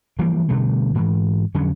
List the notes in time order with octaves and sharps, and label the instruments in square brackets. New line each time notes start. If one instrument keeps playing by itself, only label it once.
[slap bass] E3 F3 G3 A#3
B2 D3 G3 A3
G#2 E3
F2 D3 F#3 C#4